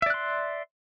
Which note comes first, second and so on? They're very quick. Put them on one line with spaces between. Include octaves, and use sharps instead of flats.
E5 D5 F#6 C6